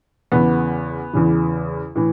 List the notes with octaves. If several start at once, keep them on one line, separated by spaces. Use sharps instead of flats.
E2 C#3 E3 B3
E2 C#3 E3
A2 E3